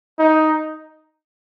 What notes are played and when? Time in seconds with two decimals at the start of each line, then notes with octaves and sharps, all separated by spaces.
0.19 D#4